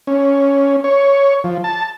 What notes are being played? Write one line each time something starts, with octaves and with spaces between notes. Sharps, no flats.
C#4
C#5
F3
A5